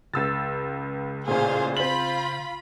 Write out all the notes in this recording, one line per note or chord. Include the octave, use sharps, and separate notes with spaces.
C#2 C#3 E6 A6
A1 A#2 G#4 C5 F5
C4 F4 B5 F#7